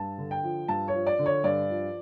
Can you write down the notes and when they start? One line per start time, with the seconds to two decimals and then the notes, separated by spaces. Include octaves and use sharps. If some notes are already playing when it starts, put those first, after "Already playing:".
Already playing: G2 A5
0.18 D3
0.31 G5
0.44 F3
0.68 G2 A5
0.88 C#5
0.94 F3
1.07 D5
1.19 D3
1.26 C#5
1.44 G2 D5
1.70 F3